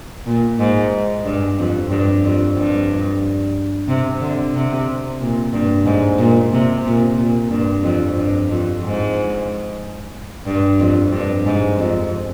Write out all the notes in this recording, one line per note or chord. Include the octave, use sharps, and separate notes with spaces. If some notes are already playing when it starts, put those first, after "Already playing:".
A#2
G#2
G2
F2
G2
F2
G2
C3
D3
C3
A#2
G2
G#2
A#2
C3
A#2
A#2
G2
F2
G2
F2
G#2
G2
F2
G2
G#2
F2